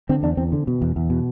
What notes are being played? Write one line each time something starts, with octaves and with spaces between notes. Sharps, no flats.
D3 C4
E2 D4
E2 C4
D3
B2
E2
E2
B2